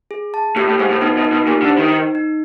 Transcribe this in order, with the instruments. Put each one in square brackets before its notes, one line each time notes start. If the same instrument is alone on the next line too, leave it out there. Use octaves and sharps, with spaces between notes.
[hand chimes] G#4
A5
[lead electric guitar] A2 [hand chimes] G4
[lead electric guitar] A2
[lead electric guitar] G#2 [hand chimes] C5
[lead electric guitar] A2
[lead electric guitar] B2 [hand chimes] D#4
[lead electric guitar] B2
[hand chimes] D#4
[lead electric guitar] B2
[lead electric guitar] A#2 [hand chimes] G4
[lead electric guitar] D3
[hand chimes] C5
[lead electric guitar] D#3
[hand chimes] D#4
D#4